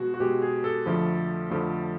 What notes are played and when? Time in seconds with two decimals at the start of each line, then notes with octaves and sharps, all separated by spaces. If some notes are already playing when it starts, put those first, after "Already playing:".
Already playing: B2 G#3 F#4
0.14 F#4
0.20 B2 G#3 G4
0.42 G#4
0.64 A4
0.86 F2 D3 F3 A3
1.50 F2 D3 F3 A3